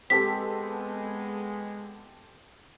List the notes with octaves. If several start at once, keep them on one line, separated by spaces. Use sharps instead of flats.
G#3 B3 C4 G4 A4 B6